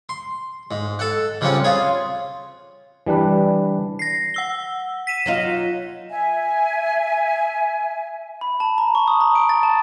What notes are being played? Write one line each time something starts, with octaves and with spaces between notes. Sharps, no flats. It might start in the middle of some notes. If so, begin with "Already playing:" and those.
C6
G#2
A4 F#5
C#3 F3 G3 C4 C#4 F#5
F4 G#4 C#5
E3 G3 D4 B4
A#6 C7
F#5 E6 G7
B6 D#7 E7
F#3 D#4 F4
E5 G#5
B5
A5
A#5
C#6
D#6
A#5
D7
A6
A5